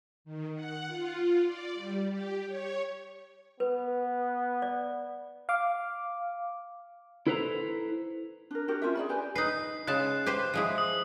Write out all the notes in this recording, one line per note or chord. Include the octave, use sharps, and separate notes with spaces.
D#3
F#5
F4
D5
G3
G4
C#5
B3 B4
D5
F5 D6
E4 A4 B4 C5 F#5 A#5
D4 A#4
D4 F#4 G4 A#4
C#4 F4 A#4 E5
G#4 D5 B5
G4 B4 G#5
D#4 B4 C7
C#3 G#3 A5 F#6
G4 B4 C5
F3 G#3 E4
D#6